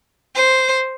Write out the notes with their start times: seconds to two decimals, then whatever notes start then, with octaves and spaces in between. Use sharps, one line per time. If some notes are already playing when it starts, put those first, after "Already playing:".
0.35 C5